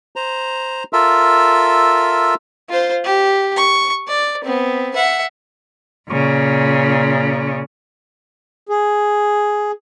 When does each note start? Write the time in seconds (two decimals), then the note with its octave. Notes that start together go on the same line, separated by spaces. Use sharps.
0.16 C5 A#5
0.93 F4 A4 A#4 E5
2.69 F4 C5
3.04 G4
3.56 C#6
4.08 D5
4.44 B3 C4
4.96 E5 F#5
6.09 A#2 C#3
8.69 G#4